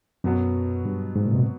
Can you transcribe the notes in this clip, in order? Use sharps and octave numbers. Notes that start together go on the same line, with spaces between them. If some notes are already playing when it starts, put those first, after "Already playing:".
F#2 B2 F#3 B3
G2
G#2
A#2
C3
B2